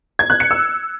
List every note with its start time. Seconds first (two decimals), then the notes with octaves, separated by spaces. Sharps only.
0.19 G#6
0.30 F#6
0.40 C#7
0.51 E6